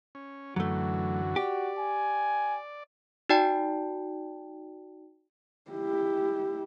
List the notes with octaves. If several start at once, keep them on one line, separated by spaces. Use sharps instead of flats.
C#4
F#2 D3 E3 F#3 A3 F#4
G4 D5
G#5
D#4 F#4 D5 G5 A5
E4 G4